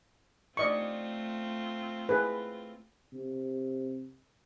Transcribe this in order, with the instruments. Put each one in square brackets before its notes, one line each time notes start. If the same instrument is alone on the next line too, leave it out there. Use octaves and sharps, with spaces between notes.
[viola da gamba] A3 C4 F4 [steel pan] D5 D#5 C#6
[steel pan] G#4 B4
[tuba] C3